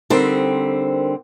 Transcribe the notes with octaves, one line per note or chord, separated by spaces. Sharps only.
D3 G3 C4 D#4 A#4 C5